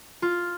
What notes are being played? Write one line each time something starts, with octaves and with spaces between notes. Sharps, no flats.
F4